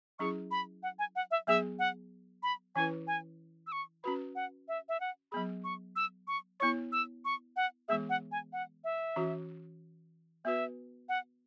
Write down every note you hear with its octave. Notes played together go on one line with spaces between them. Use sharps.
F#3 C#4 E4 G#4 C#6
B5
F#5
G#5
F#5
E5
F#3 B3 G#4 E5
F#5
B5
E3 C#4 E4 B4 G#5
G#5
E6
C#6
C#4 F#4 B4 B5
F#5
E5
E5
F#5
F#3 B3 G#4 B5
C#6
E6
C#6
B3 E4 C#5 C#6
E6
C#6
F#5
E3 G#3 B3 G#4 E5
F#5
G#5
F#5
E5
E3 C#4 F#4
B3 F#4 B4 E5
F#5